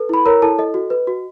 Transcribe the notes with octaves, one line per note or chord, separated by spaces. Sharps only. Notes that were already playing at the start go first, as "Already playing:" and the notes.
Already playing: A4 B4
E4 B5
A#4 C#5 A#5
E4 A4 A5
A4 D#5
F#4
B4
F#4